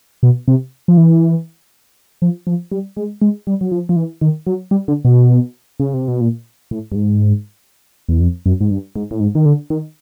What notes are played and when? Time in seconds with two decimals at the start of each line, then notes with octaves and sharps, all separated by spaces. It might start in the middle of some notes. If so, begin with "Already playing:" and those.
0.23 B2
0.48 C3
0.88 F3
0.97 E3
2.22 F3
2.47 F3
2.72 G3
2.97 G#3
3.22 G#3
3.47 G3
3.61 F#3
3.71 F3
3.89 F3
3.96 E3
4.21 D#3
4.46 F#3
4.71 G3
4.88 D3
5.05 B2
5.80 C#3
5.94 C3
6.08 B2
6.21 A#2
6.71 A2
6.92 G2
6.95 G#2
8.09 E2
8.20 F2
8.46 F#2
8.61 G#2
8.71 G2
8.96 G#2
9.11 A2
9.20 G#2
9.35 D#3
9.45 D3
9.70 D#3